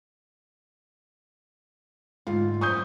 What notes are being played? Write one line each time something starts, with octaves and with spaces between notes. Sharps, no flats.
D2 G#2 F4
F#2 F3 C#6 D#6 G6